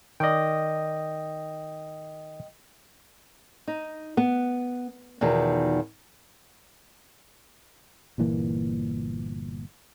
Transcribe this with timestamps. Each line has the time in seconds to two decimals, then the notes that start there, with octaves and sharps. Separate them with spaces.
0.20 D#3 D5 D#5 G5
3.68 D#4
4.17 B3
5.21 E2 B2 D#3 F3
8.18 G1 A#2 E3 A#3